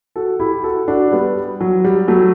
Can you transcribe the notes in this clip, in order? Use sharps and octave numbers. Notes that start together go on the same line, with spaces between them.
F#4 A4
E4 G4
F#4 A4
D4 F#4
G3 B3
F#3
G3
F#3 A3